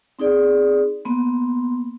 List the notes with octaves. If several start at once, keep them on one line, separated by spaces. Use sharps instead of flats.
C4 D#4 G#4 D5
A#3 B3 C6